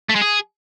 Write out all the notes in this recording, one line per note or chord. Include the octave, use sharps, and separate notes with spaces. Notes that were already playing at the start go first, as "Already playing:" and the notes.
A3
G#3
G#4